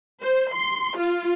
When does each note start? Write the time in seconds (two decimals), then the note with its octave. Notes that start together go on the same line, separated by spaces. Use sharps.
0.23 C5
0.54 C6
0.97 F4